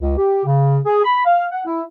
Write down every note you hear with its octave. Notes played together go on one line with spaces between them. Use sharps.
C#2
G4
C#3
G#4
B5
F5
F#5
E4